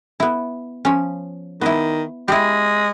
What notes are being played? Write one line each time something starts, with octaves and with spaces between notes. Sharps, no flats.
B3 E4
F3 C#4
D#3 B3 E4
G#3 E4 G4